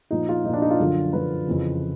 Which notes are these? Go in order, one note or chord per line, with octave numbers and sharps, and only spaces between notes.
A#2 F3 D#4
F4
A#2 F3 D4 D#4
D#4
F4
F#2 D3 F3
F#2 D3 F3 B4
F2 C#3 E3